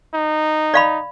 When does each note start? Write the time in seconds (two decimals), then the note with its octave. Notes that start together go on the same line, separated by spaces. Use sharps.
0.14 D#4
0.74 D5 F5 B5